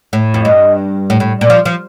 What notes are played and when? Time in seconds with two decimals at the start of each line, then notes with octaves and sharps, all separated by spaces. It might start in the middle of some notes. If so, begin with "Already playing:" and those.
0.13 A2
0.34 F2
0.45 G2 D#5
1.10 A2
1.20 A2
1.41 A#2 D5
1.50 F3
1.65 F3